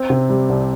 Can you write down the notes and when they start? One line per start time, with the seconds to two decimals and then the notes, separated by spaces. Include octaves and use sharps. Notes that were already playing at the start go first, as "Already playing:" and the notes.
Already playing: C4
0.10 C3
0.30 G3
0.50 C2